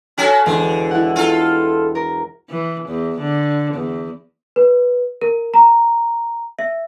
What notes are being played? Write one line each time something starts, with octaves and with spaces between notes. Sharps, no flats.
C#4 F#4 A4
E1 D3
E4 F#5
F4 A4
A#4
E3
E2
D3
E2
B4
A#4
A#5
E5